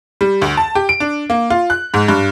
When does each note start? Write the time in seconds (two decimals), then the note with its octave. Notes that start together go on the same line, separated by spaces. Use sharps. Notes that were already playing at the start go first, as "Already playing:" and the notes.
0.21 G3
0.42 D2
0.57 A5
0.75 G4
0.89 D7
1.00 D4
1.30 A#3
1.50 F4
1.70 F#6
1.94 G#2
2.08 G2